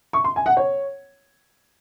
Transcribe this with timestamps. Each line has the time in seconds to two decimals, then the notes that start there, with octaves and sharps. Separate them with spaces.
0.13 C#6
0.24 C6
0.36 G#5
0.46 F#5
0.57 C#5